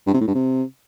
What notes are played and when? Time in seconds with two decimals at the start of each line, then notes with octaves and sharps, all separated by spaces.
0.07 G2
0.13 C3
0.20 A2
0.27 G2
0.34 C3